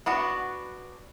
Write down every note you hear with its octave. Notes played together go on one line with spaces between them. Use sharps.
B3 D4 F#4